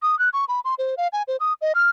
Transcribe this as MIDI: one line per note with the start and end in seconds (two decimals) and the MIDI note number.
0.02 0.18 87
0.19 0.29 90
0.33 0.45 85
0.48 0.60 83
0.65 0.75 84
0.78 0.95 72
0.97 1.08 77
1.13 1.23 80
1.28 1.37 72
1.40 1.53 87
1.61 1.73 75
1.75 1.90 89